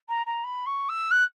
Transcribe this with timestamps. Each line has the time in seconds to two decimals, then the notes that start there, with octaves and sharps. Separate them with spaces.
0.09 A#5
0.26 A#5
0.44 B5
0.66 C#6
0.89 E6
1.11 F#6